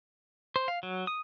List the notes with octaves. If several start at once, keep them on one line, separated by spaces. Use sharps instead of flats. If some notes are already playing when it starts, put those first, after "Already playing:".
C5
F5
F#3
D#6